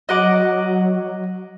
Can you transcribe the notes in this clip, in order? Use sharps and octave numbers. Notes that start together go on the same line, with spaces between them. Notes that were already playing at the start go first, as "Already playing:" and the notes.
F#3 D#5 F#5 D6